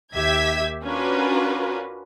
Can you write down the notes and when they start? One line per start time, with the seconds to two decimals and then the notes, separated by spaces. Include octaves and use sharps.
0.14 D#2 G4 E5 G#6 B6
0.84 C#4 D4 F4 F#4 A#4 B4